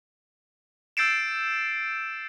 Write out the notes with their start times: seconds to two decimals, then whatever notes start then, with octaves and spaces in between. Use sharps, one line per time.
0.97 E6 G6 A6 C7 D7 E7